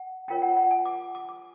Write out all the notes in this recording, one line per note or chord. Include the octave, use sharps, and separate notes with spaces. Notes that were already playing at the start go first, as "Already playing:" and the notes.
Already playing: F#5
C#4 F4 A#4 C#5 G5
F#5
F#5
G#5
D6
D6
D6